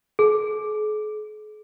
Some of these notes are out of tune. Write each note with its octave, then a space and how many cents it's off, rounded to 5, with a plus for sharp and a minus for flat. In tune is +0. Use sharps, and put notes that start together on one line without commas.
G#4 +45